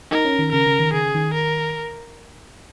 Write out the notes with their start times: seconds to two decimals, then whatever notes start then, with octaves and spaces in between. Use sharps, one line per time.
0.11 D#4 A#4
0.25 C#4
0.39 D#3
0.52 C#3 A#4
0.67 C#3
0.79 D#3
0.94 C#3 G#4
1.15 D#3
1.34 A#4